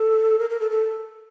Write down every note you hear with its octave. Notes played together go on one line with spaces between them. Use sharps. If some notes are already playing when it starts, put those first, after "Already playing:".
Already playing: A4
A#4
A#4
A4
A4